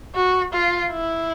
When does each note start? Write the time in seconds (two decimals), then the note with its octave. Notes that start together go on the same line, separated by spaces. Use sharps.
0.15 F#4
0.53 F4
0.92 E4